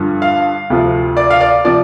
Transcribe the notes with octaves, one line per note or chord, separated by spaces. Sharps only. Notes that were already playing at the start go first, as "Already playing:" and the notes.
Already playing: G2 D3 F3
F5
D2 C3 F3
D5
F5
D5
C3 F3 D5